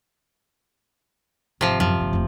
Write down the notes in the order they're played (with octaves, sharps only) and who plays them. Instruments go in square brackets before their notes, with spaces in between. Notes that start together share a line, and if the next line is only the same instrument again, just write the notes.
[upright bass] G#1 [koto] C3 F3
[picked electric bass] F#2 F#3 [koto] F3
[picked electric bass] G1 [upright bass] A#2 D#3
[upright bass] F1 D#2